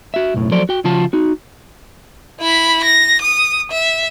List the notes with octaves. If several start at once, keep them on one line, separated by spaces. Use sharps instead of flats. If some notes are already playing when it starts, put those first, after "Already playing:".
F#4 E5
B1 F#2 A2
F3 F#3 A4 C5 D5
F#4 G5
C#3 F3 F4 F#4 A5
D#4 F#4
E4 B5
A#6
D#6
E5